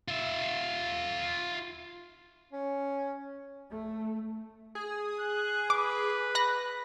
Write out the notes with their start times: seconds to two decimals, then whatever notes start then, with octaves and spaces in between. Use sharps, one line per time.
0.08 F4 E5
2.52 C#4
3.69 A3
4.75 G#4
5.20 F#6
5.70 B4 D6
6.35 B5 F#6 A#6